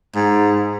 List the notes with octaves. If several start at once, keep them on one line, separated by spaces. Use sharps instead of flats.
G#2